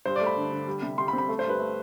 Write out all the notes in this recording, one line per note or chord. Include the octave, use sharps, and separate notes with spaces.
G2 C5
D5
A3
B5
D3
D3
G3
C3
G3 C6
B5
C4
B5
A3
C5
G2 B4
A3